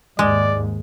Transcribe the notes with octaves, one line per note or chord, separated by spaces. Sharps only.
D#2 G#2 G#3 D5